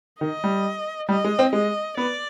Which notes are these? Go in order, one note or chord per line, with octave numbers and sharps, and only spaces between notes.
D#3 D#5
G3
G3 D#5
G#3
C4
G#3 D#5
B3 D5